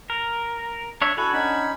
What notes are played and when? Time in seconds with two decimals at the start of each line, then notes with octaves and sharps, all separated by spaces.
0.10 A#4
1.02 D4 C#5 E5
1.17 D4 E4 F#4 A4 F#5 G#5
1.34 C#4 D#4 B5